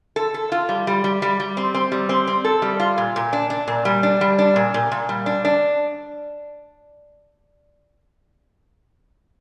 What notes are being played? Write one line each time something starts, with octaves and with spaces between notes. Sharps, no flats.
A4
A4
F4
G3
G3
G3
G3
G3
C4
C4
G3
C4
C4
A4
G3
F4
A#2
A#2
D4
D4
A#2
G3
D4
G3
D4
A#2
A#2
A#2
G3
D4
D4